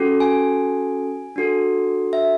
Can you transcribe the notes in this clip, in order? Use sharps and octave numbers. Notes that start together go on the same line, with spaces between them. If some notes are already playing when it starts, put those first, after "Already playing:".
Already playing: C#4 F#4 A4
G#5
D4 F#4 A4
E5